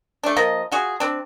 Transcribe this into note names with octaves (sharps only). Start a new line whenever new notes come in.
A3 D4
F3 A#3 D#5
F4 F#4 G#4
C4 D4